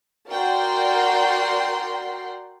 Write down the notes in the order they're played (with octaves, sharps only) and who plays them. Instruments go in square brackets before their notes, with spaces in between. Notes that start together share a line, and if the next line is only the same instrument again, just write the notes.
[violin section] F#4 A#4 D5 F#5 G5 C6